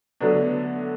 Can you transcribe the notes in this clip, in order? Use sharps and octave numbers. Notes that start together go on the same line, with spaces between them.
D3 F#3 A3 B3 D4